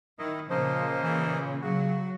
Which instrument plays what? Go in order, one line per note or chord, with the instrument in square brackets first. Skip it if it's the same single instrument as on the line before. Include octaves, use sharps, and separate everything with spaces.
[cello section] D#3 [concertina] E4 D#5
[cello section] A#2 C#3 [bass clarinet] F3 [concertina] A#3 C5 D#5
[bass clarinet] E3
[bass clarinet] C#3 [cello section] F#3 [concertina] F#4